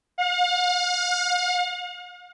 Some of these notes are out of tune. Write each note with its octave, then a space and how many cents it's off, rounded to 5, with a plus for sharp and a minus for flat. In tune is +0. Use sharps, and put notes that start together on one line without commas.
F5 +45